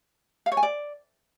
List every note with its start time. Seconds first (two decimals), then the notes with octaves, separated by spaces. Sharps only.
0.46 F5
0.52 C#5
0.57 G#5
0.63 D5